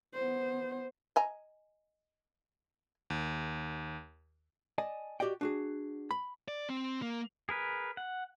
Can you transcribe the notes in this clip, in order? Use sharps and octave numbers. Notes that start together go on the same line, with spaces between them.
B3 C5
D#5 G#5 A#5
D#2
D5 D#5 G#5 A5
F#4 G4 D5 D#5 G5
D4 F#4 G#4
B5
D5
C4
A#3
G#4 A#4 B4
F#5